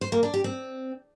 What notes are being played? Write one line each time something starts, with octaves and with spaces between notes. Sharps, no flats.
C5
A#3
D4
G4
C4